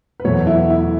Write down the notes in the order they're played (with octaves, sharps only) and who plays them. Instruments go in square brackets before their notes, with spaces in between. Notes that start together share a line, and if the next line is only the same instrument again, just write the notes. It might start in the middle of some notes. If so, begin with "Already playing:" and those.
[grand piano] B4
E2 B2 F#3 A3 C#5
E4
E4